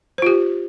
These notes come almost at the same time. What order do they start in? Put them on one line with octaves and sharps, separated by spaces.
C5 F4 G4